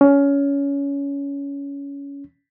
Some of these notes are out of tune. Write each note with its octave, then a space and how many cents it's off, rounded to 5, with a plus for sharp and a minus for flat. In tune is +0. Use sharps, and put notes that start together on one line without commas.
C#4 +20